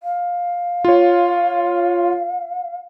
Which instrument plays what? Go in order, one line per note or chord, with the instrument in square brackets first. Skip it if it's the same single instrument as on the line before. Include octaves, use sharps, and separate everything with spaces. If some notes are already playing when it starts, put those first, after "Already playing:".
[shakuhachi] F5
[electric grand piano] F4 C#5